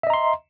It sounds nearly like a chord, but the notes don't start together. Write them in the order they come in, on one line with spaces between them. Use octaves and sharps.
E5 D#5 A#5 C6